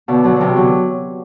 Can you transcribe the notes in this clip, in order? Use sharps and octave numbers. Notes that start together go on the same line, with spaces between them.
B2 D3
D3 F#3
C3 E3 F#3
D3 F#3